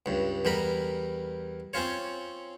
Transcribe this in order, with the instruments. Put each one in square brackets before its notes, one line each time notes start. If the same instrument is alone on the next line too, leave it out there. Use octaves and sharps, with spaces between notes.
[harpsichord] C#2 G2
E2 G3 A#4 B5
C4 C#4 F4 C#5